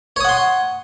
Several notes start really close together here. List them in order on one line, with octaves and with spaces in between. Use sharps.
C#5 D#6 F#5 C6